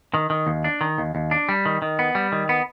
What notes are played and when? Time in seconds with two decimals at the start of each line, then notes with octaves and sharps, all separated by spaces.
0.14 D#3
0.30 D#3
0.47 D#2
0.64 D4
0.81 D#3
0.98 D#2
1.15 D#2
1.31 D4
1.49 G3
1.66 D#3
1.82 D#3
1.99 B3
2.15 G3
2.32 D#3
2.49 B3